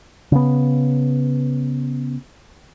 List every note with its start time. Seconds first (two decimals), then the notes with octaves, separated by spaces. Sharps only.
0.32 C#3 B3